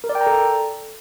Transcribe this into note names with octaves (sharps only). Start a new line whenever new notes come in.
A#4
D5
G5
A#5
A4